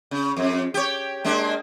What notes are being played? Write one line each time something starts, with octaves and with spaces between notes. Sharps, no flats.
C#3
F2
G4 C#5
G#3 A#3 D4